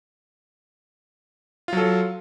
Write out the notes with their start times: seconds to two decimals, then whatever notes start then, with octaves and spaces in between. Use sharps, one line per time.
1.68 F4
1.73 F#3
1.77 A4